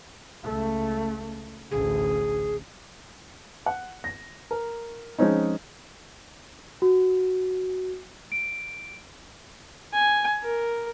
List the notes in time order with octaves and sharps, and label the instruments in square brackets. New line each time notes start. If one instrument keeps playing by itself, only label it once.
[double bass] C#2 A3
[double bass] A1 D2 [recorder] G#4
[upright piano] F#5
A#6
A#4
F3 G#3 C4 C#4 D#4
[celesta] F#4
D7
[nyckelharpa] G#5
A#4